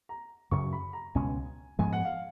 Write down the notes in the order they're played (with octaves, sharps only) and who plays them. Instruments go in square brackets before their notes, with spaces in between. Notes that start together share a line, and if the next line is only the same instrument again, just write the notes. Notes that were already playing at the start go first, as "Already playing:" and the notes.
[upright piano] A#5
[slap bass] F#2 C#3 F#3 [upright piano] C#6
[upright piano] B5
A#5
[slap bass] C#2 B2 G#3 C#4 [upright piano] G#5
[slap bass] G#2 F3 G#3 B3 [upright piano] G#5
[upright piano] F#5
F5